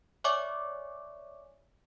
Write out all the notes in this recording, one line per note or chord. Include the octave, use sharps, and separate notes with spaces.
C#5 D5 E5 G#5 C#6 D6